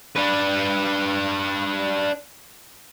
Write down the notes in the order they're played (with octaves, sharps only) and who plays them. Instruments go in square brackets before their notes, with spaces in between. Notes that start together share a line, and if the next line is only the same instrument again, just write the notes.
[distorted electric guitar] D4 B4